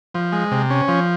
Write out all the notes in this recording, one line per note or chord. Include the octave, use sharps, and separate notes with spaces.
F3
G#3
C3
C#4
F3